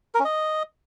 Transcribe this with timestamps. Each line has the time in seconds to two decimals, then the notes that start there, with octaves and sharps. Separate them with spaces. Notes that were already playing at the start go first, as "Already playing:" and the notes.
0.15 A#4
0.20 C#4
0.25 D#5